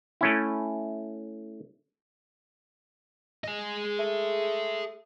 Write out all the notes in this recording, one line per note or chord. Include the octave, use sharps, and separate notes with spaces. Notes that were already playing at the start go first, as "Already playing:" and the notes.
A3 C#4 E4
G#4 D#5
A3